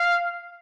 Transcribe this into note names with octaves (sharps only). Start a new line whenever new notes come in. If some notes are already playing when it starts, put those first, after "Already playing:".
Already playing: F5